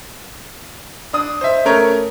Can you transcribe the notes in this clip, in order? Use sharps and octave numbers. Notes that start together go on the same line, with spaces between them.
D4 D#6
C5 D#5 E5
A3 C#4 A#4 C#5